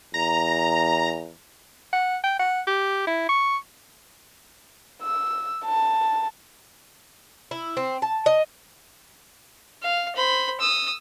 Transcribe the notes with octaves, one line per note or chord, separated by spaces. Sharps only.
E2 A#5
F#5
G5
F#5
G4
E4
C#6
E6
A5
E4
C4
A5
D#5
F5
C5 B5
D#6 E6